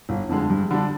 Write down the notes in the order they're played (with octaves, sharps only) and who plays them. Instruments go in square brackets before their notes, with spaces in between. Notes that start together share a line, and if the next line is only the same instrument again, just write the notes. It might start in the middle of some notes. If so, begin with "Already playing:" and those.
[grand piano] G1
F2 D3 G#3
G2
D3 G3 D4